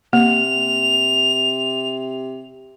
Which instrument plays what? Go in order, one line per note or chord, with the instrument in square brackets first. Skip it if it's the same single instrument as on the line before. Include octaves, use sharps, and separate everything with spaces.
[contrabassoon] C3 [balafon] A#3 [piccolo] F7